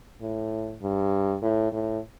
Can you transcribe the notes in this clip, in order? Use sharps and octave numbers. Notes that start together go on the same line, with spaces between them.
A2
G2
A2
A2